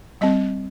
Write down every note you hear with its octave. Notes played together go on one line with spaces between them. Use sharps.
G3 C4 D#5